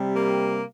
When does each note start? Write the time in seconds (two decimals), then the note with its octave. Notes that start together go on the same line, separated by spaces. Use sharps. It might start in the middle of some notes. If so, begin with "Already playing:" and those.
Already playing: C3 G3
0.15 A#3